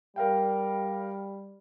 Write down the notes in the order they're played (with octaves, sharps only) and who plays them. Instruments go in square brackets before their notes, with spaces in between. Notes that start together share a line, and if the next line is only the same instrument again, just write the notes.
[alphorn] G3 [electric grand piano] A#4 F5 G5